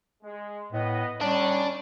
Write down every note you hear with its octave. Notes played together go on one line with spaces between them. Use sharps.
G#3
A2 B3 D#5
D3 D#3 G3 C#4 D4 C#5